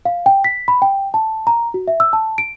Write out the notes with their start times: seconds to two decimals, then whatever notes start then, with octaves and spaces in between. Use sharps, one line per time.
0.05 F5
0.26 G5
0.44 B6
0.68 B5
0.82 G5
1.14 A5
1.47 A#5
1.74 F#4
1.88 E5
2.00 E6
2.13 A5
2.38 D7